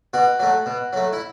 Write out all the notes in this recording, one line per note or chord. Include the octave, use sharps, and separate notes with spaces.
B2 F#4
F#3 A3
B2
F#3 A3
E4